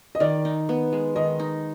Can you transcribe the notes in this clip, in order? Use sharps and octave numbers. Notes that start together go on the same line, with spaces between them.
D#5
D#3 D5
D#4
B3
G#3
D#3 D#5
D#4